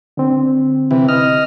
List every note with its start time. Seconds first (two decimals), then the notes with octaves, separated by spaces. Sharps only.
0.17 D3 C4
0.91 C3 E3
1.08 D#5 F6